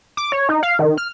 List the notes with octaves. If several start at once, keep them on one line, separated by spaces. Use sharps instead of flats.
D6
C#5
D#4
F5
D#3
F6